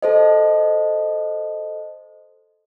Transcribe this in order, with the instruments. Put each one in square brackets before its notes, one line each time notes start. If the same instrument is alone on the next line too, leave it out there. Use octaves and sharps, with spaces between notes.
[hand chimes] A4 C5 D#5